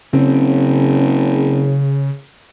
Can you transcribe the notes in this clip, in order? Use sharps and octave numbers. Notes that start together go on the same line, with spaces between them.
F#1 C#3 C4